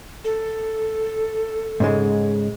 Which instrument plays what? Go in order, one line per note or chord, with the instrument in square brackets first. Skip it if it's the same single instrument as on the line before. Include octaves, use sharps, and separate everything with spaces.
[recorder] A4
[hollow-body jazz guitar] G#2 C#3 G#3